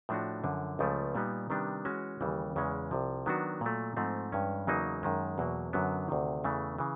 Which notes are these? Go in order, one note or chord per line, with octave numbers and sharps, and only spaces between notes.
A2 F3 A3 D4 F#4
F#2 D3 F3
C#2 C#3 F3 A3
A#2 G3 B3 D#4
C3 D#3 G3 B3 D4
E3 G#3 C#4 F#4
D#2 C#3 E3 G3
E2 C#3 E3 G#3 C#4
C2 C3 F3
D#3 F#3 B3 D4 F#4
A#2 F#3 A3
G#2 F3 A3 C4
G2 E3 G#3 C#4
E2 C#3 F#3 A#3 D#4
F#2 D#3 G#3
E2 B2 F#3 A#3
F#2 D3 F#3 B3
D2 C3 D#3
E2 C#3 E3 A3
C#3 E3